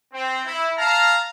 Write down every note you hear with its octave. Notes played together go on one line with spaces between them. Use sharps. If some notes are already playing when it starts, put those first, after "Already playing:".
C4
E4
F5 A5 A#5